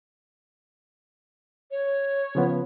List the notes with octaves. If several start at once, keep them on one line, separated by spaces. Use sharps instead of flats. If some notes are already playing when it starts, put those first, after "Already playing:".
C#5
C#3 F3 B3